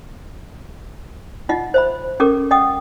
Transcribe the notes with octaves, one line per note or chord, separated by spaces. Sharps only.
D#4 F4 D#5 F#5
C5 E5 B5
C#4 G4 A4 A#4 D6
D#5 F#5 G5 D#6